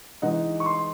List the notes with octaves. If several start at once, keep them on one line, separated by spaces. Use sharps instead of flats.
E3 G#3 D#4 F#5
C#6
C6